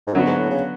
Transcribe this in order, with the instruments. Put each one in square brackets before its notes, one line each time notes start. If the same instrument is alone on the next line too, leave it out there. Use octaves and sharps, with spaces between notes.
[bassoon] G#2
[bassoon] F#2 [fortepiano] D3 F#3 B3 F#4
[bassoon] G#2
A2
C#3